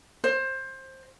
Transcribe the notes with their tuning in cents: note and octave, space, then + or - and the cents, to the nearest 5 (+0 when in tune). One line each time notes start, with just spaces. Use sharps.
C5 +20